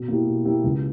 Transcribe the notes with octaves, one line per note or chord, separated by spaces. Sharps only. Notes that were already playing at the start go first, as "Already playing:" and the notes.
Already playing: B2
A#3 E4 G4
B2
A#3 E4 G4
C#2